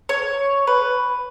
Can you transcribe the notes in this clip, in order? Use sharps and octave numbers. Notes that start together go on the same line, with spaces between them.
C#5
B4